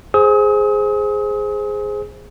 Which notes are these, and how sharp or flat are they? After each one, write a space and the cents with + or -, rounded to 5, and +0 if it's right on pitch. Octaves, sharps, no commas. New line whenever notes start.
G#4 +0 C5 +0 D#6 +40